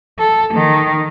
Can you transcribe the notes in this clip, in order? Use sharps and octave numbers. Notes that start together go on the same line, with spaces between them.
A4
D#3